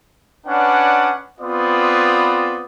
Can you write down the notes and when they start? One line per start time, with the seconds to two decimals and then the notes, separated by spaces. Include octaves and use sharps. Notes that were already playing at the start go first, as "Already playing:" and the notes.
0.46 C#4 D4 B4 D5 F#5
1.40 B3 C4 F4 B4 D5 D#6